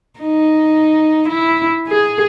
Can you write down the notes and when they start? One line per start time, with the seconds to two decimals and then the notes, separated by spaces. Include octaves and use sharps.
0.20 D#4
1.28 E4
1.88 G#4